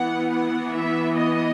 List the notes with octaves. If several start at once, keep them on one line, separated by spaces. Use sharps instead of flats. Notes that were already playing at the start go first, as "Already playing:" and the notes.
Already playing: E3 B3 F#5
F#5
E5
D#5